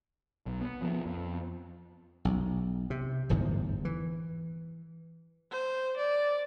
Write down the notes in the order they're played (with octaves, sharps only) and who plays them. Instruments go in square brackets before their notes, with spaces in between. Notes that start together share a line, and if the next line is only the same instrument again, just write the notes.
[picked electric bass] B1
B3
F3 B3
F2
[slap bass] B1
C3
D1 G1 E2 G#2
E3
[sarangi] C5
D5